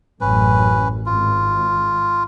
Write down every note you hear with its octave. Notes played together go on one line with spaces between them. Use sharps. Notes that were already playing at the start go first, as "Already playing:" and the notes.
A1 F#2 C#4 B4
G#1 F4